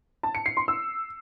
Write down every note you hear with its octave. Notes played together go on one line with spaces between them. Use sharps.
A5
C#7
C7
C6
E6